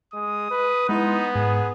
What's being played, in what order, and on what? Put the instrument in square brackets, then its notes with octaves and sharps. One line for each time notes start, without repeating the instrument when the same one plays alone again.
[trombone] G#3 [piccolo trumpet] D#6
[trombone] B4
[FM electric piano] G#3 E4 C6 [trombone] B3 [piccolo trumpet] D#4
[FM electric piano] G#2 [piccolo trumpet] G#4